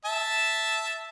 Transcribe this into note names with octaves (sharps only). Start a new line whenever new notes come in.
E5 A5